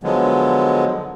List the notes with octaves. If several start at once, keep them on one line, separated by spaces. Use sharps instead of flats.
D3 F3 F#3 G#3 B3